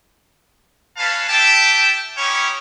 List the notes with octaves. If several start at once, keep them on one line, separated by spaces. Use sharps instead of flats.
C#4 B4 F5 A5
G4 E5 G5 A5
C#4 D#4 E4 G4 C#5